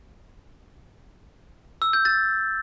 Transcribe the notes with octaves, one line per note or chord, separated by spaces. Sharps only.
E6
G6
A6